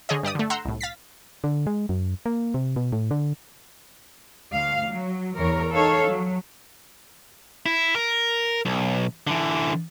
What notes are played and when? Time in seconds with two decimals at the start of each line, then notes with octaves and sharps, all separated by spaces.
0.09 D3 G#4 C#5 D#5
0.23 G2 G4 D5 D#6
0.35 D3 A3
0.50 F#5 A#5 C6 E6 G6
0.65 C2 A2
0.81 F5 A6 B6
1.44 D3
1.67 G#3
1.89 F#2
2.26 A#3
2.54 C3
2.76 B2
2.92 A2
3.11 D3
4.52 D2 F5
4.86 F#3
5.36 E2 E3 A#4 C#5
5.72 D#4 A4 C#5 F5
6.08 F#3
7.66 E4
7.96 A#4
8.65 B1
9.27 D3 E3